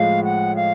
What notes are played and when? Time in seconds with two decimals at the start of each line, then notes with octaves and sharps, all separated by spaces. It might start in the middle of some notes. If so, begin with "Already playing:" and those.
Already playing: A2 F3 G#3 F5
0.24 F#5
0.56 F5